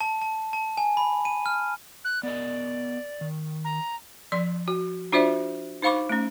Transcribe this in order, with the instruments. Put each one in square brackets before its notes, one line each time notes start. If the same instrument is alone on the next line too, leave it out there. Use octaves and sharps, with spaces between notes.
[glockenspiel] A5
A5
A5
G#5
B5
D#7
F6
[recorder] F#6
[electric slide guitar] B3 A#4 D#5 [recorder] D5
[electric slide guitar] D#3
[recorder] A#5
[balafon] F3 D5 C6
F#4
D4 F4 F#4 C5 D5 E5
D#4 C5 F5 B5 C#6 D6
A3 C#4